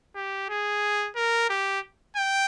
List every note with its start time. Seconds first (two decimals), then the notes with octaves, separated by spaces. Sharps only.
0.15 G4
0.49 G#4
1.16 A#4
1.49 G4
2.16 G5